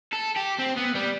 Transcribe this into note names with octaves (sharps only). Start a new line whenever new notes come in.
A4
G4
C4
B3
G3